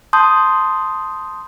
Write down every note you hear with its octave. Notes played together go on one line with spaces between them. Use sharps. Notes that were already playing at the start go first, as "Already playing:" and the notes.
A5 C6 D#6 G6